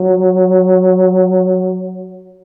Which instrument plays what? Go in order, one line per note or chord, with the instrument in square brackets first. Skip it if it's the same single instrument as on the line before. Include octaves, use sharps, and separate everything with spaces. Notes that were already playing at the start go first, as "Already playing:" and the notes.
Already playing: [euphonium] F#3